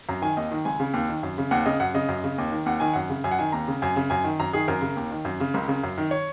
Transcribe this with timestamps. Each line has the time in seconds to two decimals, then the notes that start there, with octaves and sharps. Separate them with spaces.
0.09 F#2 A#5
0.22 D#3 G#5
0.37 D#2 D#5
0.51 D#3
0.65 C#2 G#5
0.80 C#3
0.94 D#2
1.09 D#3
1.23 F#2
1.38 C#3
1.51 D#2 F#5
1.66 C#3 D#5
1.80 F#2 F#5
1.94 C#3 D#5
2.09 F#2
2.24 C#3
2.38 D#2
2.52 D#3
2.66 D#2 F#5
2.80 D#3 G#5
2.94 F#2 F#5
3.10 C#3
3.24 F#2 G#5
3.31 F#5
3.39 D#3 G#5
3.52 D#2 A#5
3.68 C#3
3.82 F#2 G#5
3.96 C#3
4.10 F#2 G#5
4.24 D#3
4.40 F#2 A#5
4.53 D#3 G#4
4.68 F#2 A#4
4.82 C#3
4.96 D#2
5.11 D#3
5.25 F#2
5.40 C#3
5.54 C#2 A#4
5.68 C#3
5.83 F#2
5.98 D#3
6.11 C#5